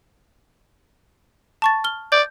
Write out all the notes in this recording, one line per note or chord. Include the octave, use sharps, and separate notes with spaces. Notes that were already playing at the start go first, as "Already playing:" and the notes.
A5 C#6 A6
F6 G7
D5 G6